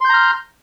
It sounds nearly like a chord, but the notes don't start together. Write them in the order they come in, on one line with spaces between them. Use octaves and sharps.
C6 G6 A#5 F6